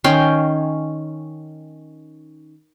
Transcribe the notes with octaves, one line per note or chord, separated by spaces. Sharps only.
D#3 C#4 G5 C6